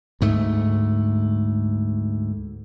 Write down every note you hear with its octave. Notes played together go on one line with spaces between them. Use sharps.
D2 G#2 A3